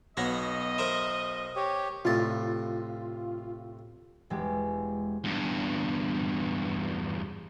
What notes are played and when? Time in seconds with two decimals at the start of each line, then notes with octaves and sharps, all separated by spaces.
0.17 B1 B3 F#4 C#5 D#5 A#6
0.78 A#4 C5 E5
1.56 G4 C#5
2.05 C2 A2 F4 A5
4.30 E1 G#3 G4
5.24 E2 G2